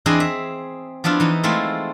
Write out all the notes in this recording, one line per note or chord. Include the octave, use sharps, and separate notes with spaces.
E2 C4 D4 E4 G#4 D#5
E5
F3 B3 D4 E4 F4
E3 D#4
G#3 A3 C4 E4 F4